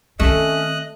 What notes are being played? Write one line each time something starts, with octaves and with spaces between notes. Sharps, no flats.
D#3 A3 C4 C#4 D#5 F#6